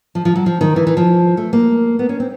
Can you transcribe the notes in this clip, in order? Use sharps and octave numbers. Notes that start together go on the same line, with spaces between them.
F3
F3
F#3
F3
D#3
E3
E3
F3
A3
A#3
B3
C#4
C4